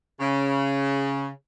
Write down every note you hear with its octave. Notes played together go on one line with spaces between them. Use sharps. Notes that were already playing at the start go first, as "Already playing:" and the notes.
C#3